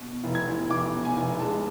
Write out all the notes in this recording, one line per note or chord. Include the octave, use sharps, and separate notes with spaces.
B2
F1
G#6
E2
F1 D6
B2
G#5
F1
G#3 A5